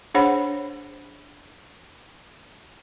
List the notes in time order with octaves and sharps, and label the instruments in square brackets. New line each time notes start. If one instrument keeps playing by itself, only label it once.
[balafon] D4 G#4 C5 C#5 F#5 B5